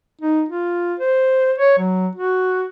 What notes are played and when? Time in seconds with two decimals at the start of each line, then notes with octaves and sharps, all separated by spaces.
0.22 D#4
0.49 F4
1.00 C5
1.59 C#5
1.79 F#3
2.16 F#4